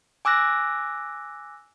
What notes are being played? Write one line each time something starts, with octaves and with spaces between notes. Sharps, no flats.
G#5 D6 E6 F#6 A#6